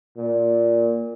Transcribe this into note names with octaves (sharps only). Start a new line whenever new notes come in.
A#2